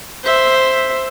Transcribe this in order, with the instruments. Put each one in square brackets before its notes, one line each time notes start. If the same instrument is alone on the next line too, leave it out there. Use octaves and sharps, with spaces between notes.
[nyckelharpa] C5 E5